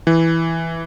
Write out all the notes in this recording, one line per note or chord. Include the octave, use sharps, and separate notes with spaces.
E3